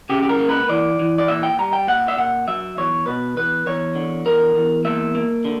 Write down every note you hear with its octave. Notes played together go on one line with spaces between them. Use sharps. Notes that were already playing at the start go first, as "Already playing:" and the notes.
C#3 G4
G4
A#4
A#3
B4
E3 D5
E3
D5
A#2 E5
G5
G3 A#5
G5
A#2 F#5
E5
A#2 F#5
F#3 E5
E2 C#5
B2 B4
E2 B4
E2 C#5
D3
E2 A#4
E2
A#3 E5
A#3
D3